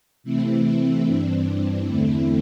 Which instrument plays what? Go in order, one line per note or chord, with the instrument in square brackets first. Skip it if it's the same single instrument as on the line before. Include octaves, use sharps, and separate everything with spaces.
[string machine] C3 E3 A3 C4 E4
G2 E3 C4 D4
E2 D3 A3 C4 E4